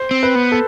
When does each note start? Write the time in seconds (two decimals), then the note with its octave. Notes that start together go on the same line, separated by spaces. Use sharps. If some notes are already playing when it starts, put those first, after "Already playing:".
Already playing: C5
0.11 C4
0.23 B4
0.35 B3
0.52 A4